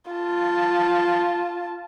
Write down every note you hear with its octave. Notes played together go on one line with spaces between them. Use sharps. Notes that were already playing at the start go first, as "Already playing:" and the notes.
F4 A5